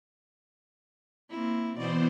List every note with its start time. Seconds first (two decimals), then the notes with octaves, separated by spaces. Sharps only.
1.30 A#3 C4 E4
1.77 B2 E3 B3 C5 D5